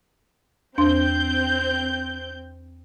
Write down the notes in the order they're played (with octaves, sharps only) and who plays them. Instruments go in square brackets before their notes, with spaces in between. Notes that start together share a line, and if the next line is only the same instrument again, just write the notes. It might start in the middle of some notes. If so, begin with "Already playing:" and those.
[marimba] E2 D4 C6 [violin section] C4 G6